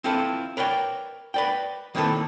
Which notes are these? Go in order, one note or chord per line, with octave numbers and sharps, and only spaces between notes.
C4 E4 F4 A4 B4
A#4 B4 C#5 D5 G5
B4 D5 G5
D#3 A#3 C4 E4 A4 B4